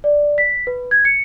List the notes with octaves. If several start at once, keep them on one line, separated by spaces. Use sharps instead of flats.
D5
B6
B4
G#6
C#7